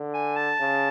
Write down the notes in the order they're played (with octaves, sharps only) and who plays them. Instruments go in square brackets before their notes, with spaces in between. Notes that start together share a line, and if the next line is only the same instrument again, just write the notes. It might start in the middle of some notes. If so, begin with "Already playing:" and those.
Already playing: [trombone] D3
[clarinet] G#5
A5
[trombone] C#3